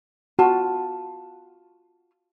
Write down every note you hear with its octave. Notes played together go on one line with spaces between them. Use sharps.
F4 F#4 A5